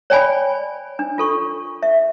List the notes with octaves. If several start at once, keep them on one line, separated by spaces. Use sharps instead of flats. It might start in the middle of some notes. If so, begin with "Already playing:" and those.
C#5 D5 G5 G#5 B5
D4
F4 A4 C#6
E5